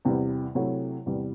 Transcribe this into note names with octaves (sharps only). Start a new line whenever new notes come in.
E2 C3 G3 B3
C3 F#3 A3 E4
E2 C3 G3 B3